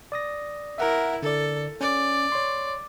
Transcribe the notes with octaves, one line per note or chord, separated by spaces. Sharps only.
D5 D#6 A#6
E4 A#4 E5 F#5 A#5
D3 A4 D5
C#4 D5
C#5 C6